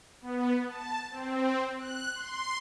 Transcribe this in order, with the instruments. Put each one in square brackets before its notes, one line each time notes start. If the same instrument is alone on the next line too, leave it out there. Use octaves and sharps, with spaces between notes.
[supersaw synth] B3
A5
C4
F#6
C6